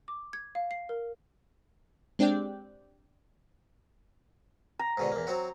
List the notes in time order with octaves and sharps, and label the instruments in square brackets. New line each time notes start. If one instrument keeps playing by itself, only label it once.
[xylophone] D6
G#6
F5
C7
A#4
[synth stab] G#3 C4 D4 G4 D5 G5
[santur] A#5
[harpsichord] G#2 B2 D3
E2 A#3
F#3 C4 F#4